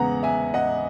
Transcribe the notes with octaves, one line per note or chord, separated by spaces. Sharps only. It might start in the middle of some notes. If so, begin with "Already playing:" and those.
Already playing: E2 C#3 G#3 B3 F#5 A#5
E5 G#5
D#5 F#5